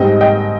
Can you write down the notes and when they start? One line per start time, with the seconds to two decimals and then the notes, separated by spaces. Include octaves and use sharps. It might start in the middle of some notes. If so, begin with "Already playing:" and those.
Already playing: G#2 G3 C4 D#5 G5
0.21 D#5 G5